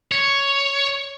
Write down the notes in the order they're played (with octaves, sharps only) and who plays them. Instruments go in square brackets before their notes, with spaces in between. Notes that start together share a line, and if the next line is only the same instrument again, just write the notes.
[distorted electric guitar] C#5